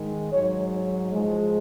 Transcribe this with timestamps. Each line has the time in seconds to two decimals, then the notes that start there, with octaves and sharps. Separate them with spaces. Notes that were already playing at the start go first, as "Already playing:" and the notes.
Already playing: G#2 D#3 G#3
0.32 G#2 F#3 C#5
0.73 C#5
1.12 G#2 F3 G#3